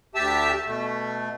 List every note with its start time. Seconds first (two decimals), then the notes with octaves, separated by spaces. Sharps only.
0.15 D2 G4 E5 A5 E6
0.67 B2 A3